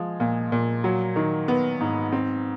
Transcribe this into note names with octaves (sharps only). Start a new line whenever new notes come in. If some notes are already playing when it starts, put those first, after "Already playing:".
Already playing: F3 G#3
A#2
A#2
F#3
D#3
B3
G#2
C4